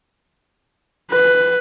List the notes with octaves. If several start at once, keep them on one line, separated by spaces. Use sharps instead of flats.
B4